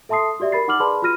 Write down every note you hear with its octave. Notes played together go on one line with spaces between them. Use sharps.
A4 E5 A5 C6 D#6 C7
F#4 G4 D5 E5
A#4 B5 A6 C7
D#4 F#5 D6 F6 F#7
G#4 B4 D5 A5 B5 C6
F4 F#4 B5 F6 A#6 D#7